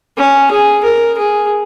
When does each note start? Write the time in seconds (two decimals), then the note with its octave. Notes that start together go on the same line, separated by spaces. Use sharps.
0.17 C#4
0.51 G#4
0.84 A#4
1.18 G#4